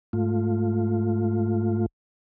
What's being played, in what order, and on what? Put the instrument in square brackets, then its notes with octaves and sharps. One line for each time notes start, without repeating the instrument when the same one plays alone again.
[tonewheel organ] G#2 A3 F4